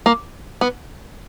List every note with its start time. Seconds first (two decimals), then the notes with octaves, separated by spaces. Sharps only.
0.06 A#3
0.61 B3